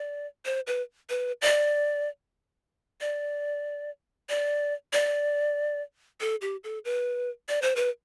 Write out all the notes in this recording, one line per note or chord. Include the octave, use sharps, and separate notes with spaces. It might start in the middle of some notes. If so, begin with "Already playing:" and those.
Already playing: D5
C5
B4
B4
D5
D5
D5
D5
A4
G4
A4
B4
D5
C5
B4